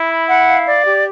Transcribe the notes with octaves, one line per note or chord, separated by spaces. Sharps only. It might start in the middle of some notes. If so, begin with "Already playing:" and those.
Already playing: E4
B5
F#5
F5
D5
G4